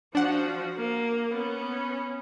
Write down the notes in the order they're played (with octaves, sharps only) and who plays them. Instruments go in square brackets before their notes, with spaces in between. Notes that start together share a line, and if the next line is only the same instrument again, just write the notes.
[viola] F3 F#4 [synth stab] D4 F#5
[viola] A#3
B3 C#4